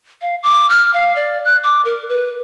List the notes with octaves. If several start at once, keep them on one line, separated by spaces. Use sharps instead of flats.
F5
D6
F6
F5
D5
F#6
D6
A#4
B4